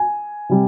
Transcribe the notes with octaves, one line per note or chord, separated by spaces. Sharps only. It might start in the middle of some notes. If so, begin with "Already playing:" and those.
Already playing: G#5
C3 G3